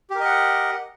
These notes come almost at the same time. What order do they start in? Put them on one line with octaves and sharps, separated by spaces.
G4 A#4 D#5 F#5